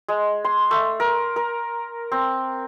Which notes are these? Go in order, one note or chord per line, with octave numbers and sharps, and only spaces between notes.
G#3
C6
A3
A#4
A#4
C4